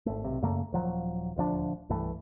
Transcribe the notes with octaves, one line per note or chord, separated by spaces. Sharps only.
G#1 A3
B1 C3
F#2 C#3 A3 A#3
D#1 F3 F#3
D#1 D2 F3 D4
C2 G2 E3 A3